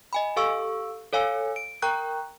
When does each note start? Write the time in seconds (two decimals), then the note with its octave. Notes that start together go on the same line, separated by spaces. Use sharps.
0.13 D#5 G#5 B5
0.36 G4 A4 F5 C#6 E6 D7
1.13 A4 C#5 F5 G#5 E6 C#7
1.56 D7
1.82 A#4 G5 A#5 C#6 F#6 G6